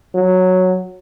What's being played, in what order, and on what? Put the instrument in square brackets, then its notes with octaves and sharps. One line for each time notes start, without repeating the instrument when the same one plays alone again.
[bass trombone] F#3